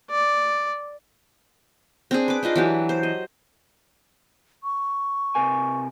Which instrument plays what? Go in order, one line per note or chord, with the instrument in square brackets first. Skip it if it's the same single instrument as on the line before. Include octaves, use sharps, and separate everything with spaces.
[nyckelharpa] D5
[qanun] C4 D4 G#4
B4 D6
D4 D#4 F4 D#5
E3 F#3 G4
C5
D#5
[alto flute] C#6
[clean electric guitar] C3 A#4 G#5